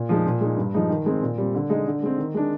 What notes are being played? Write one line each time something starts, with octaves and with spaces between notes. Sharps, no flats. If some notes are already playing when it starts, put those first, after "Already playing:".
Already playing: A#2
F3 G#3 D#4
A#2
G#3 D#4
G2
F3 G#3 D#4
D#3
G#3 C4
A#2
G3 C4
D3
G#3 D#4
D3
G#3 C4
D#3
G#3 D4